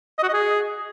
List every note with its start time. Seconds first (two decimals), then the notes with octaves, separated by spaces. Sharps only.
0.18 D#5
0.23 F#4
0.28 D#5
0.33 G#4